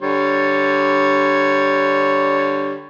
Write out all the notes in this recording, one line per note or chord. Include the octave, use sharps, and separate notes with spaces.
D3 G3 C#5